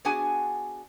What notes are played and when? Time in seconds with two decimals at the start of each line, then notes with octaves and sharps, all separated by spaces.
0.05 B3 D4 F#4 G#4 F#5 G#5